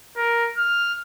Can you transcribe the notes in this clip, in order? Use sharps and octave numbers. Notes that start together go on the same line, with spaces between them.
A#4
F6